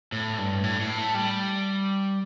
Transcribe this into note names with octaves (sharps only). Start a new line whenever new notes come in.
A2
G2
A2
A2
A3
G3